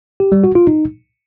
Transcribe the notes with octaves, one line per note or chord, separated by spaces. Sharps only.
G4
G3
F#4
F4
D#4